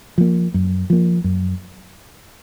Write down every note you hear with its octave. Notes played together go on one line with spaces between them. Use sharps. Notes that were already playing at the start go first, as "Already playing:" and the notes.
F3 A#3
F#2
F3 A#3
F#2